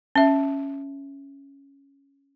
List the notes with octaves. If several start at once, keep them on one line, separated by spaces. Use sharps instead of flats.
C#4 E5